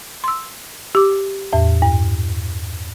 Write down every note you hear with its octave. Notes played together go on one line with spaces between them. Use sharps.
C6 E6
G4 D6
E2 A2
G2